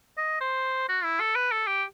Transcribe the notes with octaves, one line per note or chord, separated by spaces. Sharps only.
D#5
C5
F#4
E4
A4
B4
A4
G4